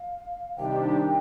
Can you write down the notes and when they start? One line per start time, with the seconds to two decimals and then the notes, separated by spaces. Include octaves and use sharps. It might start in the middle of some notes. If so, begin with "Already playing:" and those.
Already playing: F5
0.56 C3 D#3 G3 D4 G4 G5